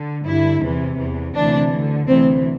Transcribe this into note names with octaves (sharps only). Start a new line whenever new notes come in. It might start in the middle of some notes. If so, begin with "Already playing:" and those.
Already playing: D3
G2 D3 E4
E2 C3 E3
E2 E3
D2 C3 E3 D4
D2 D3
D2 C3 E3 C4